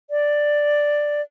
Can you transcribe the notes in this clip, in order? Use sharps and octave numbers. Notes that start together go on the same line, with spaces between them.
D5